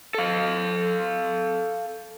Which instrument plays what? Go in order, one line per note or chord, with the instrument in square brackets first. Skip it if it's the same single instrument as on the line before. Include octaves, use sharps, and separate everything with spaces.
[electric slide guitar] A4 F5